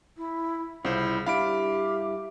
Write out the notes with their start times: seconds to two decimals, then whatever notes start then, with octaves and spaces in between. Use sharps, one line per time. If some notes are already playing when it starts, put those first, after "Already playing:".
0.17 E4
0.85 C2 C#3 E4 F4 C5
1.26 G2 D4 E4 G4 F5 B5 D7